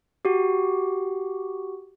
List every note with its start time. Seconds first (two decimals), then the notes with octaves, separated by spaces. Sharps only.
0.25 F#4 G4